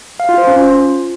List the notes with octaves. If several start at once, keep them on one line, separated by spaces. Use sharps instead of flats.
F5
F4
C5
C#4
F4